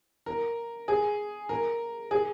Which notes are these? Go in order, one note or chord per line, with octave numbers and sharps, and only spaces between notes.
A#4
G#4
A#4
G#4